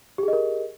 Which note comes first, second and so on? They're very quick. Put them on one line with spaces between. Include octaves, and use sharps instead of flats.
G4 G#4 D#5 A#4